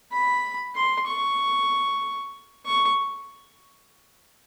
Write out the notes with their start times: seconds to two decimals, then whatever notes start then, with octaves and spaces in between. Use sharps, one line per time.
0.12 B5
0.76 C6
1.07 C#6
2.66 C#6